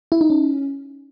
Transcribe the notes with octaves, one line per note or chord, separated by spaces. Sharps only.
E4
D#4
C#4